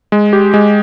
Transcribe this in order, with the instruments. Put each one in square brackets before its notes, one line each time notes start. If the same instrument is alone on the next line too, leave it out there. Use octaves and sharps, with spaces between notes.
[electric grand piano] G#3
G4
G#3